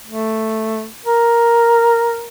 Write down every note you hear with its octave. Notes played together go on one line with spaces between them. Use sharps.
A3
A#4